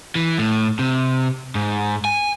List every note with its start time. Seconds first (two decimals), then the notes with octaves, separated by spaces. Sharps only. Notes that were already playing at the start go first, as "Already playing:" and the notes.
0.15 E3
0.38 A2
0.79 C3
1.55 G#2
2.05 G#5